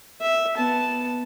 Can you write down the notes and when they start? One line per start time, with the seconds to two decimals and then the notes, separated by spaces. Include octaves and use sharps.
0.21 E5
0.57 B3 A5